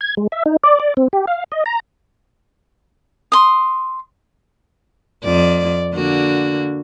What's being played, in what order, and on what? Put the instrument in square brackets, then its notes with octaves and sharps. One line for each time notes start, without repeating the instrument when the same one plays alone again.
[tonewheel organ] G#6
G#3
E5
D#4
D5
D5
C4
G4
F5
D#5
A#5
[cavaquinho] C6 D#6
[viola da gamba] F2 D5
D3 A#3 F#4